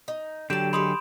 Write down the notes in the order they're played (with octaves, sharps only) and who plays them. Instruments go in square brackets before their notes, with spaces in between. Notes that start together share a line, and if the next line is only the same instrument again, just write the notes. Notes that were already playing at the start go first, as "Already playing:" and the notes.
[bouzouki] D#4
[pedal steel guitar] D3 F#3 [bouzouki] G4 A5 [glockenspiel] G6 D7 E7
[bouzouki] G#3 A3 G4 [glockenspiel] B5 C6 D#6